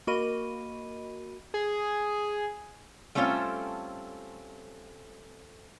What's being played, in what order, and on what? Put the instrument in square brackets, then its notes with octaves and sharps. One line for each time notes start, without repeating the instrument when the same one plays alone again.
[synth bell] A#3 F#4 A#4 D#5 B5 D#7
[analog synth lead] G#4
[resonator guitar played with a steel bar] G3 A3 C4 C#4 F4 A4